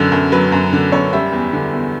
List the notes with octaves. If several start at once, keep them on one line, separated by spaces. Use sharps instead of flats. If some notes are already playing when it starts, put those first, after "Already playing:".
Already playing: F#2 D3 F#3 B4
F#2
F#3 B4
F#2
D3
F#2 C#5
G3 E5
E2
D3
E2